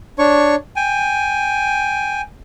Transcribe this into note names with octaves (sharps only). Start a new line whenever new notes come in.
D4 C#5 C#6
G5 G#5